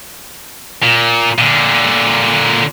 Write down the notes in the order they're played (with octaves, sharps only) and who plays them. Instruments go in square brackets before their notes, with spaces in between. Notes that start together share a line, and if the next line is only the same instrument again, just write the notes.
[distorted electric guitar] A#2
A#2 D3